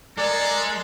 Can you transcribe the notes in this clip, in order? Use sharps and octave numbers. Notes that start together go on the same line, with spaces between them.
G#3 A4 A#4 D5